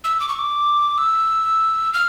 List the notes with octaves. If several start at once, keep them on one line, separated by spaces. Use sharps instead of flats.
E6
D6
C#6
D6
E6
F6